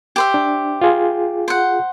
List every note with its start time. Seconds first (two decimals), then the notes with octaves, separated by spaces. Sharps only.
0.16 G4 C5 E5
0.34 D4
0.81 F4 G#4
1.48 C5 F#5